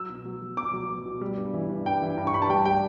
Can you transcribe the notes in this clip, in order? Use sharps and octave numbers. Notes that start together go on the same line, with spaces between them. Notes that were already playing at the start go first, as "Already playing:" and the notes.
Already playing: F#3 E6
B2
F#3
F#3
B2 D6
F#3
F#3
B2
G3
G2
E3
G2
G2 G5
E3
G2
C#6
G2 B5
A5
G3 G5
G3 G5